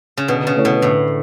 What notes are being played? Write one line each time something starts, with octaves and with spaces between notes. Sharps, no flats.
C#3
B2 D3
C#3
A3 E4 A4 C#5
B2
A2 D3